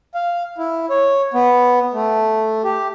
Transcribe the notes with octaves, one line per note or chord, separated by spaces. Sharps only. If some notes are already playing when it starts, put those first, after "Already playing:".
F5
E4
C#5
B3
A3
G4